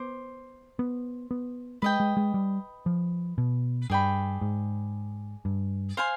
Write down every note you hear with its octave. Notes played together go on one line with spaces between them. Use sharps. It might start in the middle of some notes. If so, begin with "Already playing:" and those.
Already playing: B3 C5 D6
B3
B3
G#3 B4 D#5 G5
G#3
G#3
G3
F3
B2
G2 G#4 D5 G5 B5
G#2
G2
C5 F5 G#5 C6